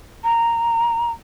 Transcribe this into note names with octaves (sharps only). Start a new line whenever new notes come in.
A#5